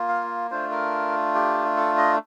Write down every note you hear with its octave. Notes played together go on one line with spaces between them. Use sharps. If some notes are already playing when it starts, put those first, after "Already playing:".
Already playing: A#3 F4
F5
A3 D4 F4 C5
A#4
G4
A4
D#5